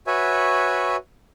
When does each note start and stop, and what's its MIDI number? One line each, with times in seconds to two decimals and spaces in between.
0.07 0.96 66
0.07 0.96 71
0.07 0.96 73
0.07 0.96 76
0.07 0.96 80